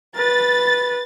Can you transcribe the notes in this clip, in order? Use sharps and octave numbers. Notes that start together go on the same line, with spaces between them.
B4 A6